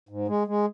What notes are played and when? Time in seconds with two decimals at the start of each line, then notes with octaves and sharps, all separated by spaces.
0.09 G#2
0.28 G#3
0.47 G#3